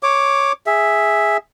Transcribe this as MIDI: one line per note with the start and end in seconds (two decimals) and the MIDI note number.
0.03 0.52 73
0.03 0.52 86
0.67 1.37 68
0.67 1.37 76